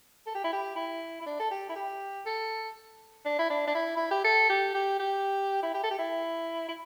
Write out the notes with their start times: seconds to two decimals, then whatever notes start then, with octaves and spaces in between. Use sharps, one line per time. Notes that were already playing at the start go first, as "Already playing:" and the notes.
0.27 A4
0.35 G4
0.44 E4
0.53 G4
0.76 E4
1.21 E4
1.26 D4
1.40 A4
1.51 G4
1.69 E4
1.76 G4
2.26 A4
3.25 D4
3.39 E4
3.50 D4
3.67 D4
3.75 E4
3.97 E4
4.11 G4
4.25 A4
4.49 G4
4.74 G4
5.00 G4
5.63 E4
5.74 G4
5.83 A4
5.91 G4
5.99 E4
6.68 E4